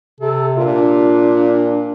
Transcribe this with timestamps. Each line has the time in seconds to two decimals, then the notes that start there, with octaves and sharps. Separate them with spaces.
0.20 C3 A4
0.57 A#2 D4 F4